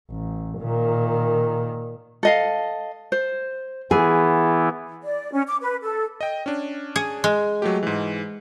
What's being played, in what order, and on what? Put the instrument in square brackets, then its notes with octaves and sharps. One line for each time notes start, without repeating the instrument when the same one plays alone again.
[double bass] A1
A#2 D#3
[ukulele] A4 D#5 F5
C5
[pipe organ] E3 B3 E4 [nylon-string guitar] G#4 [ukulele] G#5
[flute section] D5
C#4
D6
B4
A4
[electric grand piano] D#5 G5
C#4 D4
[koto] G#4
G#3
[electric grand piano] F#3 A3 G4
G#2 E3